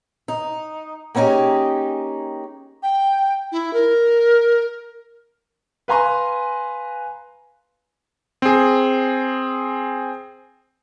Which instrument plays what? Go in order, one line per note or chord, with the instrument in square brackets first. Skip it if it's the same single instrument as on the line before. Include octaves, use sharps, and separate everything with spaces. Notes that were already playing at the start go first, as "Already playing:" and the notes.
[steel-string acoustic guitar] D#4
A#3 B3 C#4 D#4 G4 G#4
[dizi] G5
E4
A#4
[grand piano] B4 F5 G#5 A#5 C6
[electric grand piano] C4 G#4